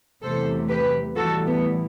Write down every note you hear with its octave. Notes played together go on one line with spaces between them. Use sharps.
E2 C3 F#3 A3 A4 C5
G4 B4
A2 E3 G3 F#4 A4
B3